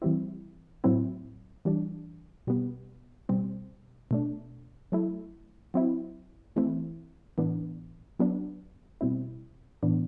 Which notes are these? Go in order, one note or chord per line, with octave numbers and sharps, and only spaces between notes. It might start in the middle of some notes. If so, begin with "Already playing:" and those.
E3 G3 C4 E4
A2 F#3 C4 E4
E3 G3 D4
B2 G3 B3
B2 G3 C4
B2 A3 D4
F#3 A3 E4
F#3 C4 E4
E3 A3 C4 E4
A2 E3 B3 D4
F#3 B3 D4
B2 G3 C4 E4
A2 E3 B3 D4